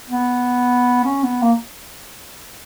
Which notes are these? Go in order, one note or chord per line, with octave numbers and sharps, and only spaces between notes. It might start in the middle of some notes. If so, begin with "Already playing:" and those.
B3
C#4
B3
A#3